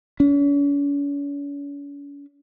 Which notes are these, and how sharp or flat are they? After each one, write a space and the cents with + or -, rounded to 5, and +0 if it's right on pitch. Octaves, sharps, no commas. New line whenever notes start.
C#4 +45